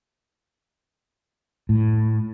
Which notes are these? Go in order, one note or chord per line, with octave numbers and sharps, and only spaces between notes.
A2